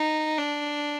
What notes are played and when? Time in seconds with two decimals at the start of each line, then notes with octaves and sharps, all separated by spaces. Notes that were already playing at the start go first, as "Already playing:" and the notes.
Already playing: D#4
0.38 D4